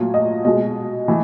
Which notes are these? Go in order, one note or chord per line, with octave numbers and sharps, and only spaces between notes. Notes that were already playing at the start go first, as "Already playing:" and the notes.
Already playing: A#2 F#3 A3
D#5
B2 G#3 D#5
E3 A3